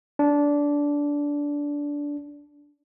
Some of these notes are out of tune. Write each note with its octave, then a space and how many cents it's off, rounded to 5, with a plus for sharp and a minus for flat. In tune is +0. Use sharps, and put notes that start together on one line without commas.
D4 -15